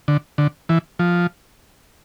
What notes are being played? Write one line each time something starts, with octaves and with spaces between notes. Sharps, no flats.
D3
D3
E3
F3